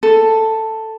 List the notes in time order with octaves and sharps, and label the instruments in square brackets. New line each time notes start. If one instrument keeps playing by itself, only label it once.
[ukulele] A4